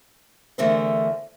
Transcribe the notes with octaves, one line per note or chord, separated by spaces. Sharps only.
E2 D3 E3 A3 A#4 C5